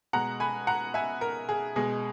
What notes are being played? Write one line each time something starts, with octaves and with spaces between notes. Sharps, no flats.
B2 G#3 F#5 A#5
G#5 B5
F#5 A#5
E5 G#5
A#4
G#4
B2 G#3 G#4